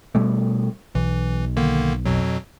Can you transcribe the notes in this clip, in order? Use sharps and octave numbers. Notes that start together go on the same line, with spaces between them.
B2 G3 A3
B1 E3
D3 D#3 A#3
F2 B2 F#3